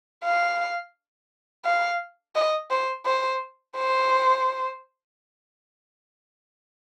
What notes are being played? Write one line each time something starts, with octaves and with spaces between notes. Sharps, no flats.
F5
F5
D#5
C5
C5
C5